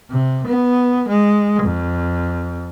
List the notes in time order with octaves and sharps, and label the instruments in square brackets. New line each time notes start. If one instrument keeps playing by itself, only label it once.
[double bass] C3
B3
G#3
F2